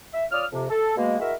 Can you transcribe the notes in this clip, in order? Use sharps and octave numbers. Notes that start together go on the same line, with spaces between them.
E5
F4 C#5 D5 D#6 F6
F2 C3
A4
B2 G#3 A#3
G#3 E4 F#4 A#4 E5